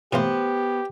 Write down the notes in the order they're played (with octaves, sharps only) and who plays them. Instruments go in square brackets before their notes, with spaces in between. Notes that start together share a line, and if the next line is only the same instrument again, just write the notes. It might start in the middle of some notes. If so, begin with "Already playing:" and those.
[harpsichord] A2 E3 A#3 [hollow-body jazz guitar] B3 C5 [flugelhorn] G4